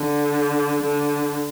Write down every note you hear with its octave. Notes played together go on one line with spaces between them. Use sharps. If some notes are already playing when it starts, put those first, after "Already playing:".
Already playing: D3
D3